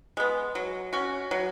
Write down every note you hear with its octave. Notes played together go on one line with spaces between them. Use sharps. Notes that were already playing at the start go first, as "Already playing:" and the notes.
G#3 B3
F#3
C#4 F#4
F#3